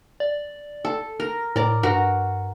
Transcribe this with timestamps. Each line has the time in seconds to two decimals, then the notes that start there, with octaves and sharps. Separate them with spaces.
0.20 D5
0.85 A4
1.20 A#4 A#6
1.56 A2 A#4 D5
1.83 G2 F#4 A#4